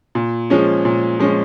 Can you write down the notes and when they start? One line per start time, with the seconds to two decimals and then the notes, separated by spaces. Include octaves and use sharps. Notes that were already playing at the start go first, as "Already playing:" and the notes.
0.15 A#2
0.50 F3 G#3 C#4
0.85 A#2
1.19 F3 G#3 C#4